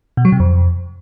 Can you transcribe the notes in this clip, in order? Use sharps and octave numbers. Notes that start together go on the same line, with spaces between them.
B2
F#3
C3
F2